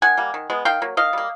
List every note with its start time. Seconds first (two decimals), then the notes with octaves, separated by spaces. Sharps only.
0.02 D#3 F#5 G#5
0.17 G3 A#3
0.34 D#3
0.50 G#3 B3
0.65 D#3 F5 G5
0.82 F#3 A#3
0.97 D#3 D#5 F5
1.13 G3 A#3